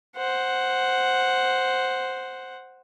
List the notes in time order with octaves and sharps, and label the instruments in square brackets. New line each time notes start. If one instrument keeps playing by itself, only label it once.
[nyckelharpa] C5 F#5